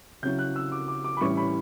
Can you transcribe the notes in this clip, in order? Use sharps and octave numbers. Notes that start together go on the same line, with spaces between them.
C#3 F#3 C#4 E4 G6
F#6
E6
D6
D6
D6
B5
A2 E3 G3 C#4 E4 C#6
B5